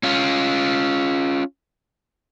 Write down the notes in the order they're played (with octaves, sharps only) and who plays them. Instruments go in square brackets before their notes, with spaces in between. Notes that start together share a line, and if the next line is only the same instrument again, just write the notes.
[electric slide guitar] C#4 F4